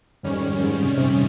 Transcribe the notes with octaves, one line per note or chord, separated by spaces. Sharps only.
F2 G#2 D#3 G3 C#4
G#2
G#2
C3
C3
A#2